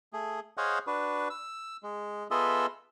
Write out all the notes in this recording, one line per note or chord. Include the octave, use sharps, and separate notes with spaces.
A3 G#4
G#4 C5 C#5 D#5 F5 F#5
D4 F#4 B4
E6
G#3
B3 F4 G#4 A4 D#5 E5